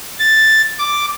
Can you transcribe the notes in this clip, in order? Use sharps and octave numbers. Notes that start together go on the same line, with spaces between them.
A6
D6